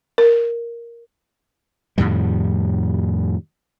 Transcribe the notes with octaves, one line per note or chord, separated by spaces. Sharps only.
A#4
F2 A2 D#3 G3